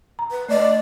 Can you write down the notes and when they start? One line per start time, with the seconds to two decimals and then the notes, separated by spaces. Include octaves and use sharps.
0.19 A#5
0.31 B4
0.49 A3 D5 D#5